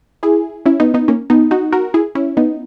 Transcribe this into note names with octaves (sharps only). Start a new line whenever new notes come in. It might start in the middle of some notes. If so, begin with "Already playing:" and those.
E4 G#4
C#4 E4
B3 D#4
B3 D#4
A#3 C#4
B3 D#4
D#4 F#4
F#4 A#4
E4 G#4
C#4 E4
B3 D#4